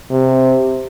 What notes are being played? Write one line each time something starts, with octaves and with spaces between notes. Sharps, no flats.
C3